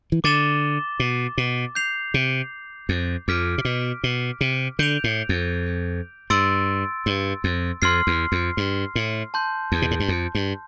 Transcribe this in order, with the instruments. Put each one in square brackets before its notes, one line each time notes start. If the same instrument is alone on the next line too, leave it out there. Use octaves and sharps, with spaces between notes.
[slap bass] E3
[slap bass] D3 [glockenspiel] D6 A6 E7 G7
[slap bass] B2
B2
[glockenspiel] G6 C7 F7
[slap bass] C3
F2
[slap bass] F2 [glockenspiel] D6 F6 B6 D7
[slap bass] C3
B2
B2
C3
[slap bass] D3 [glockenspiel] G6 D7 F7
[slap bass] A2
F2
[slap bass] G2 [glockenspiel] C6 E6 A6 D7
[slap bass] G2
F2
[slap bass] F2 [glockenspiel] C6 F6 C7
[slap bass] E2
F2
G2
A2
[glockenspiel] A5 C6 G6
[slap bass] E2
B2
A2
G2
F2
G2